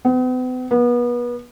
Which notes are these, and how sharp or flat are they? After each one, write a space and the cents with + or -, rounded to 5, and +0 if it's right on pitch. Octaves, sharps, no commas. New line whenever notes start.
B3 +45
B3 -30